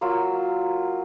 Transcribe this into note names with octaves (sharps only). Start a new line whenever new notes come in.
F#3 A#3 F4 E6